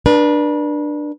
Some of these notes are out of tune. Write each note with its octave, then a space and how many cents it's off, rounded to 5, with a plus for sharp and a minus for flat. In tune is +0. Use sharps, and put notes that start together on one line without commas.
D4 +15 B4 -35